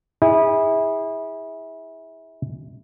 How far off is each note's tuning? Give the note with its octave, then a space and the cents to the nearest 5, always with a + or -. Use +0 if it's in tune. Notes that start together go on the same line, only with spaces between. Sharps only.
E4 -25 G#4 -25